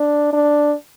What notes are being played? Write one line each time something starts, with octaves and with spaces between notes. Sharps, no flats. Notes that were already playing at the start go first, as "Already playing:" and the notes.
Already playing: D4
D4